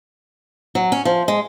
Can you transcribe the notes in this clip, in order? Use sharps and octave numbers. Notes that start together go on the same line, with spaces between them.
F#3
C#4
F3
G#3